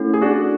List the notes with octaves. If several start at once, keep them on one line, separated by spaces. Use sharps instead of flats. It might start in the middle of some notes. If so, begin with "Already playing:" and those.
Already playing: A3 C#4 E4 A4
G#4
D4 F#4